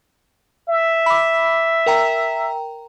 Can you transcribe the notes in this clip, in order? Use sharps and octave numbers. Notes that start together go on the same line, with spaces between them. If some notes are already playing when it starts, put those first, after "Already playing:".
E5
B5 D6
A#4 G5 A#5